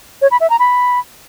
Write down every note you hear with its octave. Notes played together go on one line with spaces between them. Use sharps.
C#5
B5
E5
A#5
B5